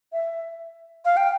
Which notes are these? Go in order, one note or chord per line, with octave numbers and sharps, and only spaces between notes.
E5
F5
G5